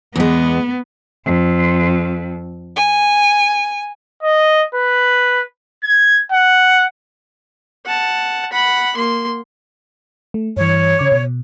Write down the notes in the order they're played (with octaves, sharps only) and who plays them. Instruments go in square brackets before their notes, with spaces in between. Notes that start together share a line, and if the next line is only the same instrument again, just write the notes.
[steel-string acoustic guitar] E2 G#3 [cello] B3
[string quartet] F2
G#5
[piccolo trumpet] D#5
B4
G#6
F#5
[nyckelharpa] F#5 A5
F#5 B5
A#3 C6
[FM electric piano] A3
[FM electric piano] G2 E3 [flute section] C#5
[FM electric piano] C#3 D6
B2